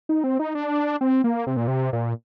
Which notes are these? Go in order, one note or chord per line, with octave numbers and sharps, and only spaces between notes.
D#4
C4
D#4
D4
C4
A#3
C3
A#2
C3
A#2